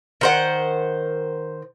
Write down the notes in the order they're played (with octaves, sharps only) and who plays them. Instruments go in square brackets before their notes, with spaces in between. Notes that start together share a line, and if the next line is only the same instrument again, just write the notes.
[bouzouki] D#3 C5 F#5